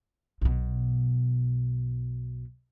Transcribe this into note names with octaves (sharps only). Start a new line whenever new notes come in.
B1 B2